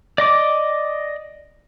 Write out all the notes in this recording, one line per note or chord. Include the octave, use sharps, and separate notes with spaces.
D5 D#5 D6